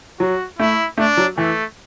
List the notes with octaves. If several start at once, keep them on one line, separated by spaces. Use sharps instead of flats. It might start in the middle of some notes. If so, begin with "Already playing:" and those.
F#3 F#4
A3 E4
A3 D4
F#3
E3 A3